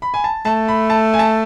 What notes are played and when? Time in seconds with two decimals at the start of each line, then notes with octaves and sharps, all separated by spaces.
0.02 B5
0.14 G#5
0.24 A5
0.45 A3 A5
0.68 B5
0.90 A5
1.14 G#5
1.19 A5